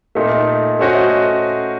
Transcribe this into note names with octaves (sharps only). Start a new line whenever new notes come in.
A#2 A3 D#4
A3 C#4 F#4 C5 D#5